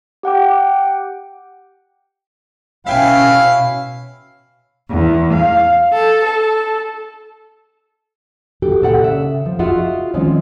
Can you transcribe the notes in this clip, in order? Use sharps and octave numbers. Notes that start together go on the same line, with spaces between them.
G4 F#5 G5 D6
B2 C#4 E4 E5 F5 G5 G#5
E2
F5
A4
A4
F#4 G4 A4 G5
A#2 A4 F#5 G5
C#3 E5
F3
F4 F#4 G#4 D#5 E5 F#5
D#3 F3 G#3 C4 C#4